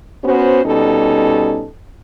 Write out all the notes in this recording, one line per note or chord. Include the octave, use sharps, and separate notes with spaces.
B3 C#4 F#4 C5
B2 G3 C#4 D#4 A4